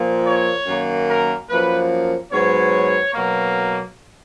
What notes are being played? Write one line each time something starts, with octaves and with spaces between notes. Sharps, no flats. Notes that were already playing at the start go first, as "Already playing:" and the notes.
Already playing: A#2 F3 A#3
C#5
F#2 D#3 A#3
A#4
F#2 F3 A#3 B4
G#2 F#3 B3 C#5
B2 F#3 A#3